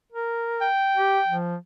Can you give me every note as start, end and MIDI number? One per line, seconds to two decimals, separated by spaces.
0.12 0.67 70
0.61 1.36 79
0.96 1.19 67
1.28 1.56 53